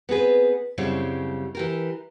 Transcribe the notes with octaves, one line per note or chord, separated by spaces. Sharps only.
B3 C4 G#4 B4
F#2 C#3 G3 C4 E4
E3 G4 A#4